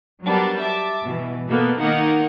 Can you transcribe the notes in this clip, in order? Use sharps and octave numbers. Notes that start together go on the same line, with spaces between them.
F#3 G3 B3 D4 A#4
E5 A5 D6
B2 E3
B2 A#3 B3 A4
D#3 A#3 D#4 A#4 F#5